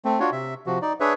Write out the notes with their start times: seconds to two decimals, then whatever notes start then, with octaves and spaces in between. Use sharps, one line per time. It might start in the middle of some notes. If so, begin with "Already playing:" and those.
0.05 A3 C4
0.20 D4 F4 F#4 C#5
0.32 C3 E5
0.67 C3 F3 F#4
0.82 D#4 D5
1.00 D4 G#4 B4 C#5 E5